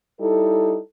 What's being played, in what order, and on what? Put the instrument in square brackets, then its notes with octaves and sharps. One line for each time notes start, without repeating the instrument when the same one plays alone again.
[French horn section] G3 D#4 E4 A4